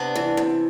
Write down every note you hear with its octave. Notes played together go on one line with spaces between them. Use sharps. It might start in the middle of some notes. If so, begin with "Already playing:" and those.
Already playing: C3 B3 D4
E3
C3